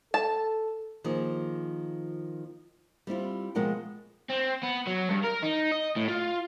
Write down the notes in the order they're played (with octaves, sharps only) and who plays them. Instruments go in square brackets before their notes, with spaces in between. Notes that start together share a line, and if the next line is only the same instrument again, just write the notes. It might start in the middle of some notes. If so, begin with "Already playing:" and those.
[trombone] A4 [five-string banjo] A5
[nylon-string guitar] D#3 F3 A#3 G#4
G3 C4 E4 F4
B2 F3 G#3 A#4 F#5 G5
[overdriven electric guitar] C4
B3
F#3
G2
A#4
D#4
D#5
A2
F4